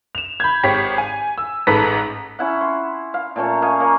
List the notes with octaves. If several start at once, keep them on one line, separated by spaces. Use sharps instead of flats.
E7 F7
B5 G6 G#6
G#1 G4 C#5 B6
G#5
E6
A1 G#2 A4 B4 B6
C#4 E4 F#5
C6
F5
A#2 A3 C#4 C#5
D#5 F5 G#5
A#3 C#5